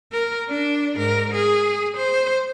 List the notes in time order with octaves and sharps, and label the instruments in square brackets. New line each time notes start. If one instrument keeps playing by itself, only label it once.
[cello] A#4
D4
G#2 A#4
G#4
C5